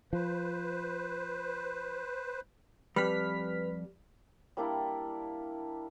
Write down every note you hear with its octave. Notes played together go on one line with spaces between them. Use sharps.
F3 B4 C5
F2 G3 B4 F6 B6
G3 A#3 D4 E4